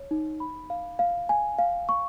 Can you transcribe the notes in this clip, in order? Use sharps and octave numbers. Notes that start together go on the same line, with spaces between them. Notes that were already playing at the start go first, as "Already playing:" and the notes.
Already playing: C#5
D#4
B5
F5
F5
G#5
F5
C#6